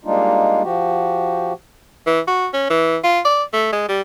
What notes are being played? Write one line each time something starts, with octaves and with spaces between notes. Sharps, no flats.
G3 G#3 A#3 D4 D#4 F4
F3 F#4 G4
E3
F#4
C#4
E3
F4
D5
A3
G#3
G3